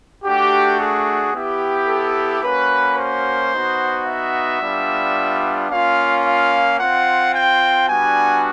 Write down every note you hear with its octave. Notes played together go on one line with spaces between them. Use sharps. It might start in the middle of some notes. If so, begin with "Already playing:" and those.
A3 D4 F#4 G4
G#4
B3 E4 G4
A4
A#3 C#4 F#4 B4
C5
B3 D#4 F#4
E5
G3 B3 D4 F4
A#3 C#4 F4 F5
F5
C4 F4 F#5
G5
G3 B3 D4 F#4 G#5